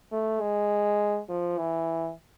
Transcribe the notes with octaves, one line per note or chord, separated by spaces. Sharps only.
A3
G#3
F3
E3